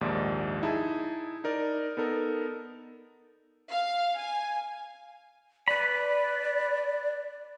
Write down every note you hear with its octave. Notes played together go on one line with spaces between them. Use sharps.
A#1 D#2 G#2 D#4 D5
D#4 E4 G#4 A5
D#4 A#4 D5
B3 D#4 A4 A#4
F5
G#5
B4 D5 B5